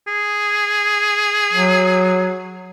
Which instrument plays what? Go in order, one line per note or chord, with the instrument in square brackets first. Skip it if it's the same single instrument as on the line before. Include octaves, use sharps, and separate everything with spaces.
[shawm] G#4
[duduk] F#3